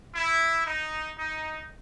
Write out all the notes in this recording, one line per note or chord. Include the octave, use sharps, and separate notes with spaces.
E4
D#4
D#4